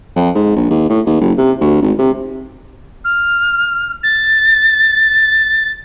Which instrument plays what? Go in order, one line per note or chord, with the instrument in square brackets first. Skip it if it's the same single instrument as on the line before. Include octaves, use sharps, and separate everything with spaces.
[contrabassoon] F2
G#2
A#1
D#2
A2
D#2
F#1
C3
D2
G#1
C3
[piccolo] F6
A6